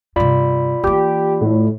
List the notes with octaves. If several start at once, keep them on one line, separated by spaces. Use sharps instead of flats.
G2 C3 F4 D5 B5
E3 A#3 G4
A2